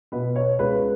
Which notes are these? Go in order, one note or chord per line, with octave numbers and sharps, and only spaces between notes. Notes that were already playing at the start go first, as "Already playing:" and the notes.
B2 B4
C#5
C#2 B4